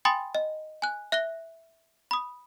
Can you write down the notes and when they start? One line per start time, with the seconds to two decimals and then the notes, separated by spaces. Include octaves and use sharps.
0.05 G5 G#5 B5 C6 D#6 A6
0.35 D#5
0.82 G#5 F#6
1.12 E5 F#6 A#6 G7
2.11 B5 D#6